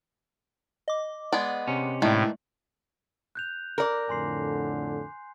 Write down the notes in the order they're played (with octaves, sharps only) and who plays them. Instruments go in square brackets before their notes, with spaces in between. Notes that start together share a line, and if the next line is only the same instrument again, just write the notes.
[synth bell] D#5 D6
[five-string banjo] G#3 B3 D5
[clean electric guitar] C3 C#4
[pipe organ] A2 [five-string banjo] D#3 E3 D4 [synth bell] G#3 A3 D5
[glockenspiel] F#6 G6 F7
[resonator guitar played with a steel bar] A#4 D5
[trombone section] F2 A2 D3 [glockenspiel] G#5 C6 C7